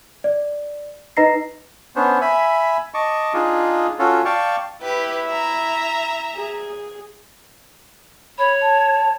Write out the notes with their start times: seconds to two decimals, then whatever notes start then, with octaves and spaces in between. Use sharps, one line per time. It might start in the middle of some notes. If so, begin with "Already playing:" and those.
0.24 D5
1.17 D#4 B4 D#5 A#5 A#6 C7
1.96 B3 C#4 D4 C5
2.21 E5 G#5 B5
2.94 D#5 A5 C#6 D6
3.34 D4 D#4 F4 G#4
3.99 C#4 F4 F#4 A4
4.25 D5 F5 G5 A5 C#6
4.82 E4 G4 B4
5.27 E5 A#5
6.36 G#4
8.38 C#5 B5
8.61 A5